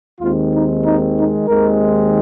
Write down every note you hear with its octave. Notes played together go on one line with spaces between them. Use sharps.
D#2 D#3 G#3 C4 F4
D#4
D#4
D#4
D#2 D#3 G#3 C4 A#4